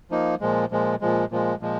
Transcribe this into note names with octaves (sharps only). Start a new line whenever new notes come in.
F3 A#3 D#4
A#2 F3 G#3
A#2 F3 G#3
A#2 F3 G#3
A#2 F3 G#3
A#2 F3 G#3